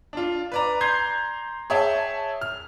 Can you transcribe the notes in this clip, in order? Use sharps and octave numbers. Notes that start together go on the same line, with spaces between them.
D4 F4
B4 D5 A#5
A#5 C6 G6 G#6 C7
G#4 C#5 E5 G5 A5
F6